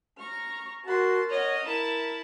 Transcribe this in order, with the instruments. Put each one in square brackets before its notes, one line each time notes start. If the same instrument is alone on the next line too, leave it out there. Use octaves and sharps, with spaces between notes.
[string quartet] A#5 C#6 F6
[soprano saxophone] F#4 [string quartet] A#4 A5 C6
[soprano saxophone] C#5 [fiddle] D#5 [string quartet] F#5 F6
[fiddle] E4 A5 [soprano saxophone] A#4 [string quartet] E5